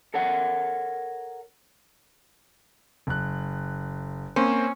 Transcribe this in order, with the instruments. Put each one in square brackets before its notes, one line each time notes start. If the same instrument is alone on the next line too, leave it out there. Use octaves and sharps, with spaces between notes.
[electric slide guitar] A4 A#4 C#5 F#5
[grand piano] F#1 F#6
[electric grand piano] A#3 C4 C5 [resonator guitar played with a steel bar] C#4